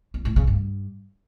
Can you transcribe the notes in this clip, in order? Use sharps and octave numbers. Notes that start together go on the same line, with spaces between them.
E2
A2
C#3
G2